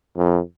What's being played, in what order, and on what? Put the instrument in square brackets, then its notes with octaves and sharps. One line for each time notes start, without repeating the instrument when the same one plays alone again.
[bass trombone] F2